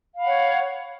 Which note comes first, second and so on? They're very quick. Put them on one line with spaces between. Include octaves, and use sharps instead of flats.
F5 B5 F#5 C#5